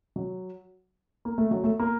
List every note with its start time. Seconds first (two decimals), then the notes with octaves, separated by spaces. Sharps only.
0.16 F#3
1.25 A#3
1.38 A3
1.51 F#3
1.64 A3
1.79 A#3